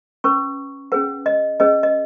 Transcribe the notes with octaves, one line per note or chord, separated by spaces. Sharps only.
C#4 B4 C#6
C#4 G#4 B4 F#5
D#5
C#4 G#4 B4 D#5
D#5